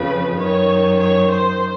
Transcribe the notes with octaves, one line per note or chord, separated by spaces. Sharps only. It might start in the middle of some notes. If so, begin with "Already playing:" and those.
Already playing: F2 C#3 F3 B4
F#2 D#3 C#5
C#5
C5